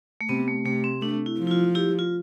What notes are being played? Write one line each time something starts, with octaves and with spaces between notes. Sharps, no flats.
A3
C3 B3
A3
C3 A3
C4
A3 D4
E4
F3
E4
F4
E4 G4
F4